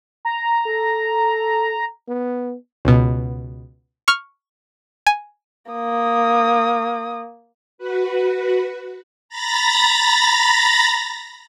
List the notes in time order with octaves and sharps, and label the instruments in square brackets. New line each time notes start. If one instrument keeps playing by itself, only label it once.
[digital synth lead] A#5
[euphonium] A4
B3
[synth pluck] C#2 B2
C#6 F6
G#5
[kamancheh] A#3 D#6
[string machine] F#4 B4
A#5 B5 A6 A#6